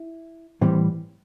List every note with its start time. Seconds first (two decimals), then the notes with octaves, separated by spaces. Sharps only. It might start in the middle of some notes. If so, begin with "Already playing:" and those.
Already playing: E4
0.61 A2 E3 G3 C4